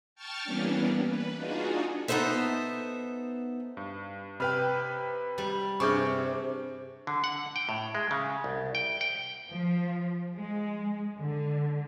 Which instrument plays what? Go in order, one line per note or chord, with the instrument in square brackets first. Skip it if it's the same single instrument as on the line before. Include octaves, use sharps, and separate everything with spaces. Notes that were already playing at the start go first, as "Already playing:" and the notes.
[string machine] G5 A5 C#6 F6 A6
E3 G3 A#3 B3 C#4 D4
B4
D4 D#4 F4 F#4 G#4
[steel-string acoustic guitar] B3 D#4 A4 C5 E5
[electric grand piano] G2
[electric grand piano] C3 B4 G5 [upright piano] B5 F6
[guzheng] G3
[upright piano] G2 G#4 [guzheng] C3 [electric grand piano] C#6 D6 G6
[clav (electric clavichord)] D3
F#5
G5
A2
G#3
C#3
C2
G5
G5
[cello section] F3
G#3
D3